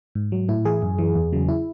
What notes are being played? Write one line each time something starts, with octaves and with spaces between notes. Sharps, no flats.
G#2
F#3
A2 E4
E3 G#4
F#2
E3
E2
C#3 F#3
E4